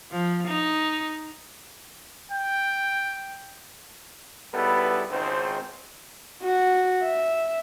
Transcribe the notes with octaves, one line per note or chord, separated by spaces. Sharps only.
F3
D#4
G5
C#2 G3 B3 E4 A4 B4
G#1 C#2 G#2 D#3 C4 C5
F#4
E5